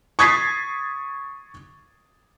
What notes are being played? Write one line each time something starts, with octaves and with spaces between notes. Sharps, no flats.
C#6 D#6 G#6 A6 B6 C7